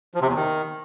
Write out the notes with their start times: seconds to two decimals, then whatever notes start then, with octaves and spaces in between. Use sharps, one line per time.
0.14 F3
0.21 C3
0.28 E2
0.35 D#3